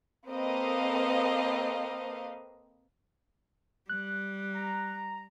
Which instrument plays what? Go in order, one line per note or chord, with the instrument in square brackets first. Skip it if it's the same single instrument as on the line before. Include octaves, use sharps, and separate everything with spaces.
[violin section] A#3 C4 A4 B4 D#5 F5
[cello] G3 [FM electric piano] F#6
[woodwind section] A#5